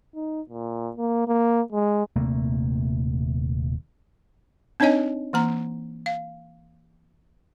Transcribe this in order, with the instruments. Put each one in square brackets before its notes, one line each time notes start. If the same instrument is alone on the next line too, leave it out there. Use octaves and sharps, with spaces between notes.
[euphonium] D#4
A#2
A#3
A#3
G#3
[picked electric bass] D#1 C3 A3 A#3
[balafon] C4 D4 D#4 C#5 D#5 G#5
E3 A#3 A#5
F5